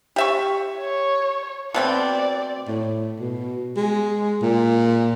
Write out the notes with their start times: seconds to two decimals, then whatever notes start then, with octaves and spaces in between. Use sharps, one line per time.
0.16 G4 E5 C#6
0.78 C#5
1.74 B2 A3 C4 D5
2.68 A2
3.19 B2
3.77 G#3
4.42 A#2